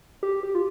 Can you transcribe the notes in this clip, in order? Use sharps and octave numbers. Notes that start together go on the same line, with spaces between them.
G4
G4
F4